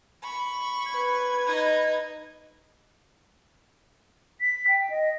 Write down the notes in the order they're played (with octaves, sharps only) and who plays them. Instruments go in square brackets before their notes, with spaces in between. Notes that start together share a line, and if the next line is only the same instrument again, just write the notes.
[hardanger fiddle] B5 C#6
[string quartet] B4 G#6
[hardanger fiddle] D#4 D#5
[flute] B6
G5
D#5